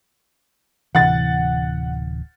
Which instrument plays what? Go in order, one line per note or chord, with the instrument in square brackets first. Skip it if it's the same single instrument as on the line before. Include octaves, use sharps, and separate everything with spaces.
[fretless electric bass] D1 C3 E3 [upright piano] F#5 A6